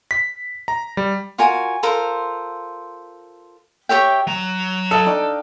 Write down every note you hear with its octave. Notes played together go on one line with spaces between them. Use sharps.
B6
A#5
G3
F4 F#4 A#4 G#5
F4 A4 A#4 C5
G4 C#5 E5 G5
F#3 A#5
A4 D#5 F5
D4 D#4 G5